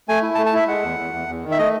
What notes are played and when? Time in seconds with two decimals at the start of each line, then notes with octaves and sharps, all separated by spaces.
0.08 A3 G#5
0.23 E4
0.35 A5
0.38 A3
0.46 A5
0.53 E4 E5
0.68 G#3 F#5
0.83 E2
0.99 E2
1.13 E2
1.28 E2
1.44 D#3
1.51 E5
1.58 A3 D#5